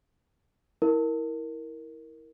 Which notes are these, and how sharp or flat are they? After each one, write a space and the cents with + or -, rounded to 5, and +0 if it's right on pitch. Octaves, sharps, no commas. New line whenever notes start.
E4 -25 A#4 +0